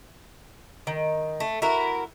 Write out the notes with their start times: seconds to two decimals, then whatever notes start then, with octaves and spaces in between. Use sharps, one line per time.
0.87 D#3
1.40 A3
1.62 E4 F#4 A#4